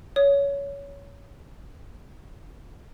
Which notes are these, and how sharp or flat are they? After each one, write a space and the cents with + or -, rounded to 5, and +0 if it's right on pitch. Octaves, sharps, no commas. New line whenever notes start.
C#5 +20